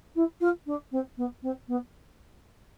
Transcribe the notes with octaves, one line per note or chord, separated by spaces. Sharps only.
E4
F4
D4
C4
B3
C4
B3